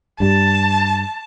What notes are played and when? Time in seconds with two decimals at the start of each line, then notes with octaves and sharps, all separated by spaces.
0.20 G2 G3 A5